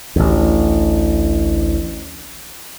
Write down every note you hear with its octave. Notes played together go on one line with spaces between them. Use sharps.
A1 D2